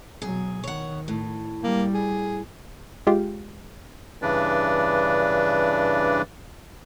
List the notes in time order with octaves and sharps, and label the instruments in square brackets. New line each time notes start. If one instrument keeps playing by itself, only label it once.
[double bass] B2 F#3 [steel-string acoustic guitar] G#4
[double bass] D#3 [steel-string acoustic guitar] C#5 F#5
[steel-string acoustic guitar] A2
[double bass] G3 [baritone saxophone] A#3
[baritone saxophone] G#4
[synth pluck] G#3 F4 G4
[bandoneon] G2 C#3 E3 D4 B4 D5